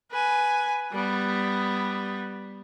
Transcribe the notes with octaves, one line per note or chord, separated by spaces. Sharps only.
B4 G#5
G3 B3